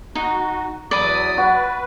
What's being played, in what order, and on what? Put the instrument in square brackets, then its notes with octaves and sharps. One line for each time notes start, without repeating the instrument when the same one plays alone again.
[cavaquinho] D#4 [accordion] F#4
[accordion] E2 F#3 D#6 [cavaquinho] D5 B5
[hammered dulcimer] F#4 [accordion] B4